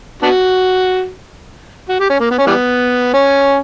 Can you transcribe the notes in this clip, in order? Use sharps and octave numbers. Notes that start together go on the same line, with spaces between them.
B3 D4 F#4
F#4
G4
C#4
A#3
B3
C#4
E3 G3 B3
C#4